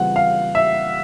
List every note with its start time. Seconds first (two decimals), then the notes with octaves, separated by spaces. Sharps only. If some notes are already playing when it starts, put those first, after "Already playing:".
Already playing: C#3 E3 G3 C4 F4 F#5
0.16 F5
0.55 E5